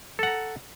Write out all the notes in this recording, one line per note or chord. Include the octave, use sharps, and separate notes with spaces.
A4 F#5 A#5